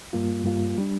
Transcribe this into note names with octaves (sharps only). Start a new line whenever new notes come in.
G2 G3 A#3 F4
G2 G3 A#3 F4
G3 D4